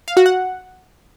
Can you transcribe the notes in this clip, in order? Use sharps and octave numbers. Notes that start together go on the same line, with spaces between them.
F5
F#4
F#5